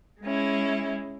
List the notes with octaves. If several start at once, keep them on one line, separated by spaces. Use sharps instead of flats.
G#3 C#4 E4